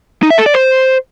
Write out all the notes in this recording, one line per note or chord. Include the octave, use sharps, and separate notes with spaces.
D#4
E5
A4
D5
C5